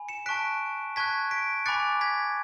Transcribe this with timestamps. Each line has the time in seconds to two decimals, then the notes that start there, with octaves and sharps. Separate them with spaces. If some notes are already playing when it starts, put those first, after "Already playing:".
Already playing: G#5 B5
0.09 C#7 E7
0.26 A5 C#6 F#6 B6 D7
0.96 A5 C#6 F#6 G#6 B6
1.31 B6 D7
1.66 G#5 B5 D6 F#6 A6 C#7
2.01 G#6 B6